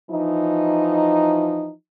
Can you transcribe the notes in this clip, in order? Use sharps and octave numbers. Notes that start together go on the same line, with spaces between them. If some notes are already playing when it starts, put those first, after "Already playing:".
E3 F3 D#4